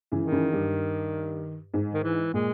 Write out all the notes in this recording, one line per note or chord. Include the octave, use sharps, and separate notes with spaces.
C#3 E3
D#3
C#3 E3
G2
G#2
D#3
E3
A#2 G#3